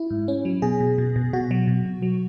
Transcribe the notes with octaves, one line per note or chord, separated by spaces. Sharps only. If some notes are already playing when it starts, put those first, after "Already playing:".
Already playing: E4
G#2
C#4
F#3
B2 G#4
B2
B2
B2
B2 F#4
F#3
B2
B2
F#3